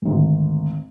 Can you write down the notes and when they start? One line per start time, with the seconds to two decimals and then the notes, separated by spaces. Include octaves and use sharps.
0.02 G#1 D2